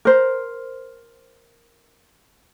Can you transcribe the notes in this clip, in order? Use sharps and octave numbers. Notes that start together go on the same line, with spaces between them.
A#4 C5